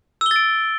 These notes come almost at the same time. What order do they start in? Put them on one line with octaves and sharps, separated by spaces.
E6 G7 A6 D7